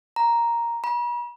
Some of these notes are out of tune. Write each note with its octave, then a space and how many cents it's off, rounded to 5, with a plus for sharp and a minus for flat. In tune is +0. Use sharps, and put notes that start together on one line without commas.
A#5 +5
B5 -45